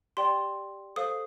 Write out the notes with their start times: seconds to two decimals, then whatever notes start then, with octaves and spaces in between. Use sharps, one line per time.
0.17 G4 D5 G5 C6
0.96 A4 C5 F5 D#6